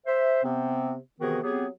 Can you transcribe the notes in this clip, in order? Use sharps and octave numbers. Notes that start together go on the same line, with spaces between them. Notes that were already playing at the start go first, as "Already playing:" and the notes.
C5 E5
C3 B3 C4
C3 D#3 E3 B3 F#4 G#4
F#3 B3 C4 G4 G#4